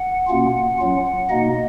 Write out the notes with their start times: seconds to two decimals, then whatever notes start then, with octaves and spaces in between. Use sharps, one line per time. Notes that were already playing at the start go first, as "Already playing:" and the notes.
Already playing: F#5
0.28 B2 A#3 C#4 F4
0.79 F#3 C#4 F4
1.30 B2 A#3 D#4 D#5